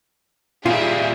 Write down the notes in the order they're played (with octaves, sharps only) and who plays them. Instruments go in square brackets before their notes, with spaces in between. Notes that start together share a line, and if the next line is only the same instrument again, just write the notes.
[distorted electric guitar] A#2 G3 [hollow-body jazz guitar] F4 [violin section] G#4 D#5 E5